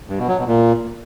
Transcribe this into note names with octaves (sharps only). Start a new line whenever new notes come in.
G2
B2
F#3
B2
A#2